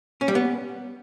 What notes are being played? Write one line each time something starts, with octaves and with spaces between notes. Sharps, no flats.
C#4
G3
B3